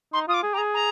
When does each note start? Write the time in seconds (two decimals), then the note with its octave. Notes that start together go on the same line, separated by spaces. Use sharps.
0.13 D#4 C6
0.28 F4 D#6
0.33 D6
0.43 G#4
0.54 G4 A#5
0.59 G#4
0.74 A#5